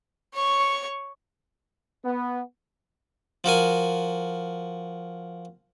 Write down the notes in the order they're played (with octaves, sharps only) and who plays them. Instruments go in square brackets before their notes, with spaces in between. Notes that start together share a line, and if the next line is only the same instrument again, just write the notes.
[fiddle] C#5 C#6
[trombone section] B3
[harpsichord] F3 F#4 A#4 G#5